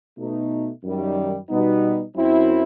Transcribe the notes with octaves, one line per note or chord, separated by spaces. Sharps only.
B2 A3 D#4
F#2 D#3 G3
B2 G3 B3 D#4
F#2 F#3 C4 E4